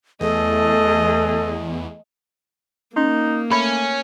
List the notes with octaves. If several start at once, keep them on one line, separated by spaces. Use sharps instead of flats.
E2 A3 G#4 A4 D#5
A#3 C#4 D#4
A3 C#4 B5